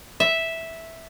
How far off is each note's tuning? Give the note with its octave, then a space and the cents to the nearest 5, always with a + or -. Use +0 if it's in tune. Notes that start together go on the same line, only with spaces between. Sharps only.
E5 -5